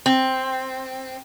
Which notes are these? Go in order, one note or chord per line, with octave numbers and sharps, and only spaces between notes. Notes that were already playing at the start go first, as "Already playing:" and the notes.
C4